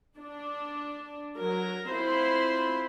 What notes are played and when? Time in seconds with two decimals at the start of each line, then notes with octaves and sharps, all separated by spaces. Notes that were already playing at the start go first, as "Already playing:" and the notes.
0.16 D4
1.36 F#3 A#4
1.90 C4 E4 F4 C5 B5 C6